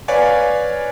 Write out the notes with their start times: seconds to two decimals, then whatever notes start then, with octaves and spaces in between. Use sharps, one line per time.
0.08 B4 C#5 D5 F5 G#5